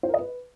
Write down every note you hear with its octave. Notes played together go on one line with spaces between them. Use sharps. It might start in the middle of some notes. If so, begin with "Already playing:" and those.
C5
A#4
D#5
B4